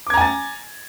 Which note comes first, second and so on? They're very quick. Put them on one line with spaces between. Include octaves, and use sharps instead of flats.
D6 G#6 A#5 G#5 A6